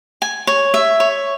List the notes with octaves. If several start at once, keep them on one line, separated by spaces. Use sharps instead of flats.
G#5
C#5
E5
C#5